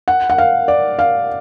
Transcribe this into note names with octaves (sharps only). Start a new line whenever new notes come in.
F#5
F#5
F5
D5
F5